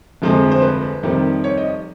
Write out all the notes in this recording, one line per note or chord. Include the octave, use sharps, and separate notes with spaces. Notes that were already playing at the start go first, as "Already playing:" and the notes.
G1 F2 C3 F3 G#3
C5
B4
F2 C3 D#3 G3
C#5
D#5